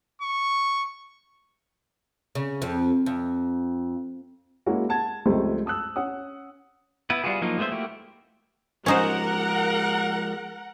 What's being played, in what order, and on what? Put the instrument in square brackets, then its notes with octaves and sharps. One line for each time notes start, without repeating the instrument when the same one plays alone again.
[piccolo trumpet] C#6
[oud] C#3
F2
F2
[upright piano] G#3 A#3 C#4 E4 F#4
F#5 A5 G#6
C#2 F3 G3 A3 C4 D#5
A5 D#6 E6 F#6
C#4 F#5 D#6
[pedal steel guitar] B3 E4 B4
G3 B3 F4 F#4 G#4
F3 F#3 A#3 D#4 F4
G#3 A3 B3 C5 E5
A3 A#3 E4 F#4 G4
[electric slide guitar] F3 G#3 [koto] C#4 D#4 C5 [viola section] A#4 F#5